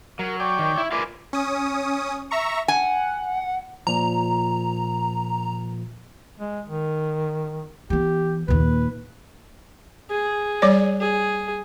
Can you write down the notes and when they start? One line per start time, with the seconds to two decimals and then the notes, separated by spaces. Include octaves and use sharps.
0.19 F#3 A#4
0.40 C#5 D5 G5
0.59 D#3
0.78 E4
0.92 F4 A#4 B4 D5 G#5 D6
1.33 C#4 D#6
2.31 E5 A#5 C#6
2.68 F#5 G#5
3.87 A#2 F3 A#5
6.40 G#3
6.66 D#3
7.90 E3 B3 G4
8.48 D#2 A#2 B4
10.10 G#4
10.62 G3 C#5 D5
11.00 G#4